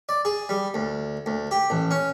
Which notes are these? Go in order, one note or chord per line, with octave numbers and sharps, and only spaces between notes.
D5
G#4
G3
D2
D2
G4
A1
C#4